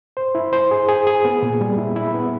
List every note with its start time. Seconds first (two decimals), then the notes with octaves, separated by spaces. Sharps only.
0.17 C5
0.35 E4
0.53 C5
0.71 G#4
0.89 G#4
1.07 G#4
1.25 B3
1.43 A#2
1.61 G3
1.78 E4
1.96 E4
2.14 B3